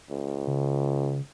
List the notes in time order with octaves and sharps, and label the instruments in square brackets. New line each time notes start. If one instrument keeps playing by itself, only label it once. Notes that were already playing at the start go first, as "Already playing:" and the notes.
[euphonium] C#2
[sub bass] C#3